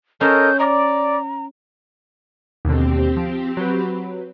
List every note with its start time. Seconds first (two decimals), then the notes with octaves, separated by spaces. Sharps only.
0.21 C#4 A4 A#4 D#5 G6
0.59 D5 A#5
2.65 D#2 B2 D3 C4 G4
3.16 F3
3.57 F#3 B4